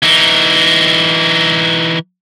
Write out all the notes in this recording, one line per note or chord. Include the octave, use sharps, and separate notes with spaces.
E3 D#4